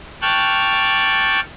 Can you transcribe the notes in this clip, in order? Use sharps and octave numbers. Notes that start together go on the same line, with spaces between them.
G5 A5 C#6 D6 F6 F#6